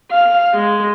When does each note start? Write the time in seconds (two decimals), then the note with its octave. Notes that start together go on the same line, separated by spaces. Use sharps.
0.11 F5
0.54 G#3